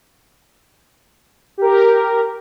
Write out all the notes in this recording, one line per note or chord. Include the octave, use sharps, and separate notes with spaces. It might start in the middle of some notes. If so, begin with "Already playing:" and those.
G4 A#4